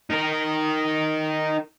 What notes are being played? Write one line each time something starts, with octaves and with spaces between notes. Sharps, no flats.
D#4 A#4